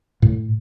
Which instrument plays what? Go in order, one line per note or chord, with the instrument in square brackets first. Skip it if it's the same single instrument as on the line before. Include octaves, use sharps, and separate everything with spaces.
[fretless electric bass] A2